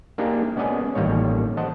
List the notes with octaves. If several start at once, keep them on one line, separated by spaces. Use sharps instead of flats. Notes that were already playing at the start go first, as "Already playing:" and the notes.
A#3 D4 D#4 G4 G#4
G#3 B3 C#4 D5 D#5 G#5
A1 D#3 G3 A#3 C#5
C5 D#5 F#5 A5